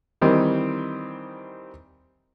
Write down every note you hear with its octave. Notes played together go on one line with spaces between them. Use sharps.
D#3 E3 G3 C4 D#4